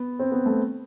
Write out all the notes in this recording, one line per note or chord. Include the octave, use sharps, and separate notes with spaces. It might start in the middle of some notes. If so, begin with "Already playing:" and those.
Already playing: B3
C4
B3
A3